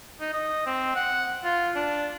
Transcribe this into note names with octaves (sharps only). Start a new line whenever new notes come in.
D#4
D#5
C4
F#5
F4
D4